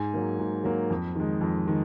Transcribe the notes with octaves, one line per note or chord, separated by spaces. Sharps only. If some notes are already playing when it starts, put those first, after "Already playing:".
Already playing: G#2 G#5
F#3 A#3
G#2
F#3 A#3
F2
D#3 G#3
F2
D#3 G#3